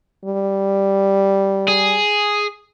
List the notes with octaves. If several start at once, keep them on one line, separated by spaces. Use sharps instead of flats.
G3
G#4